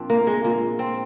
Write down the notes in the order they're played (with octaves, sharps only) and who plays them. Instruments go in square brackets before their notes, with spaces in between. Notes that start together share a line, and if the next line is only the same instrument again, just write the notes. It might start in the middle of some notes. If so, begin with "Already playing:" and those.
Already playing: [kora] A#2 F3 C4 D4
A#3
G#3
A#2 G#3 A#3
C4